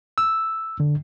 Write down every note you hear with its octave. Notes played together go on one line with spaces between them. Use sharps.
E6
D3